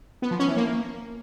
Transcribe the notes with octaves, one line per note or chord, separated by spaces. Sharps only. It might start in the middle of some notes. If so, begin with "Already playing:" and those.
B3
F3
C#4
E3
A#3